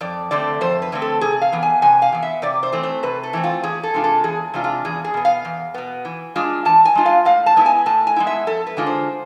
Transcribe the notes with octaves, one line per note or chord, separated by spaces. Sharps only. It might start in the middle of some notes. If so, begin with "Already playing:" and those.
F2 D5
D3 A3 C4 D5
F2 C5
B4
D3 A3 C4
A4
C3 G#4
F5
E3 B3
G#5
C3 G#5
F5
E3 B3
E5
C3 D5
C5
E3 A3 C4
C5
C3 B4
A4
E3 A3 C4
F4
E2 G#4
A4
C3 G#3 D4 F4
A4
E2 G#4
C3 G#3 D4 F4
F4
E2 G#4
G#4
B2 B3
F5
E2
B2 B3
E3
G#3 D4 F4
E3 A5
G#5
G#3 D4 F4
F5
A2 F5
A5
G#3 B3 E4
G#5
A2 A5
G#5
G#3 B3 E4
E5
F2 A4
B4
D3 G#3 D4 F4
C5